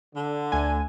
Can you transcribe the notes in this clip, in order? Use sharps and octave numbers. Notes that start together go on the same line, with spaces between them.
D3
D2 A3 G#5